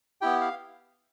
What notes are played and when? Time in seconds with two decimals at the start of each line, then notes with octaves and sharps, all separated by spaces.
0.21 B3 E4 G4 G5
0.41 F5